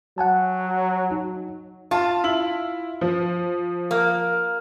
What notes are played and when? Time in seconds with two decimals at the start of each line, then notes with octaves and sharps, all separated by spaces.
0.18 F#3 F#5 G#5 A5
1.11 D#4
1.91 F4 A5
2.24 E4 F#7
3.01 F3
3.91 A#3